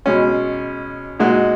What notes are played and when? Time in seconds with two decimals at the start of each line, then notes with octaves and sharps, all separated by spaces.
0.06 B2 G#3 C#4
1.20 A#2 G#3 D#4 F#4